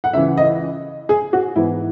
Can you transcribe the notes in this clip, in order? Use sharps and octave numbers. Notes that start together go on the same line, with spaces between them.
F#5
C#2 C#3 E3 E5
D#5
G#4
F#4
G#2 E3 B3 E4